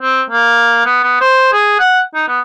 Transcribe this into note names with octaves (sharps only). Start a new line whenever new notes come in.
C4
A#3
B3
B3
C5
G#4
F#5
D#4
B3